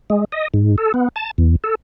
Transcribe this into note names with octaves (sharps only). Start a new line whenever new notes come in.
G#3
D#5
G#2
A4
B3
A5
E2
A4